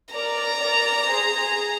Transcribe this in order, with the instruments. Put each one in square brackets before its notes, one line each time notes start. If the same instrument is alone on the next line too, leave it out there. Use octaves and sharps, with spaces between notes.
[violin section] A#4 D5 [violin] A#5
[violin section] A#4 D5
G#4 C5
G#4